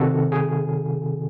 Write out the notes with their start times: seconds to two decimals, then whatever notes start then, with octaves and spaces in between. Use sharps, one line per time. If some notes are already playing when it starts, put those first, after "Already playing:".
Already playing: C3 D#3 F#4 A4
0.32 G#4